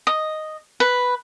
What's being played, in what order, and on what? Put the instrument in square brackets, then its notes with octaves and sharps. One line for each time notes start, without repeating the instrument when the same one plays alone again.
[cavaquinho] D#5
B4